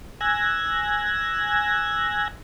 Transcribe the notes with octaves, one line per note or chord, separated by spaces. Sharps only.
G#5 E6 F#6 G#6 A#6